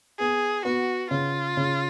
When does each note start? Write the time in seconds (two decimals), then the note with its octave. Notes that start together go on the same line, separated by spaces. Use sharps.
0.19 B3 G#4
0.65 B3 F#4
1.11 C#3 F4
1.57 C#3